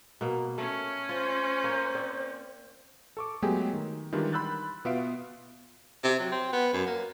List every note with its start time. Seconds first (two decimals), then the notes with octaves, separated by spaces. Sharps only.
0.21 B2 A#3
0.58 A3 C#4
1.09 F4 C5
1.64 A#3 C#5
1.95 C4 D5
3.17 A4 C#6 D6
3.42 F#3 G#3 A3 B3 G4 G#4
3.73 D#3
4.13 D#3 E3 G3 G#3 D4 F4
4.33 B5 C6 E6 F#6 G6 A6
4.85 B2 B3 F4 E5 F5 D7
6.03 C3
6.19 F#3
6.32 C4
6.52 B3
6.73 F#2
6.86 A#3